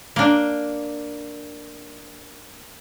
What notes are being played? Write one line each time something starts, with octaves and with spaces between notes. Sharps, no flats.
A#3 D4